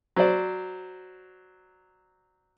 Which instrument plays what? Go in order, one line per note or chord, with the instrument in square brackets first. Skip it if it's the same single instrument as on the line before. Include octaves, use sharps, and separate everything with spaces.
[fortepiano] F#3 C5 D5